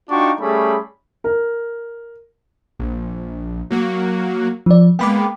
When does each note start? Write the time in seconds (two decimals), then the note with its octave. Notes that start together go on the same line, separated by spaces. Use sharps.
0.10 D4 D#4 F4 F#4 G5 C#6
0.41 G3 A3 C#4 G#4 B5
1.24 A#4
2.80 A#1
3.71 F#3 A#3 F#4
4.66 F3 D5
4.99 G#3 A#3 B3 G5 B5 D6